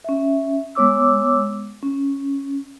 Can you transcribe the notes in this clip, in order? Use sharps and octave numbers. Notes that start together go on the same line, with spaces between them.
C#4 E5
G#3 B3 C#5 D6 E6
C#4